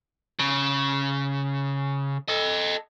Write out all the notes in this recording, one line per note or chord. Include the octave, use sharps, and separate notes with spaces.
C#3
A4 D#5